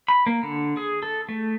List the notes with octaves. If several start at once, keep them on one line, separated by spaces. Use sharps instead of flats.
B5
A#3
D3
G#4
A4
A3